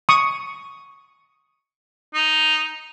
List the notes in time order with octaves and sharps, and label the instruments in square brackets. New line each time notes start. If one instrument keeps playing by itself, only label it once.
[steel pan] C#6 D#6
[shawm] D#4